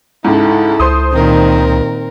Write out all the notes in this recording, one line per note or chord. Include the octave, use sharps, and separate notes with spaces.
C#2 G#2 E4 A4
C#2 C5 C6 D#6
A#2 D#3 C4 A#4